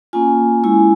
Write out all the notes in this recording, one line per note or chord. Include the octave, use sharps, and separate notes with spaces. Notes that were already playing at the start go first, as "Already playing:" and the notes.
A#3 C#4 F4 G#5
G#3 C#4 E4 G#5